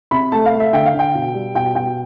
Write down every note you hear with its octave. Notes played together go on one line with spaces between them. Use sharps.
C3 B5
A3 A5
F5
A3
E5
D3 G5
F5
D3
G5
B2
G3
B2 G5
B2 G5